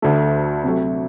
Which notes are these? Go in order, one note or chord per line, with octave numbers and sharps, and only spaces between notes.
D2 D3 A3
C3 F#3 A3